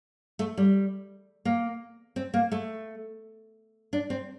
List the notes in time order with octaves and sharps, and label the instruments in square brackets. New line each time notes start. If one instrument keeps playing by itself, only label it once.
[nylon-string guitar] A3
G3
A#3
C4
A#3
A3
D4
C4